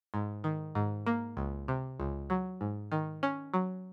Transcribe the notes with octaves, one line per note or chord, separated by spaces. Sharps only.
G#2
D#3
G#2
A#3
C#2
C3
C#2
F#3
G#2
D#3
C#4
F#3